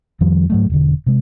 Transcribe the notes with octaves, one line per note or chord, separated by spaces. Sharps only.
F2 D#3 F3 G3
G#2 F#3 A3
E1 D3
C3 G#3